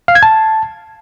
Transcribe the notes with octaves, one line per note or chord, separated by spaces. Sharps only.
F5
G#6
A5